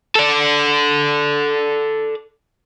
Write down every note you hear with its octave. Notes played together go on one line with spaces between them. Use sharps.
A4 D5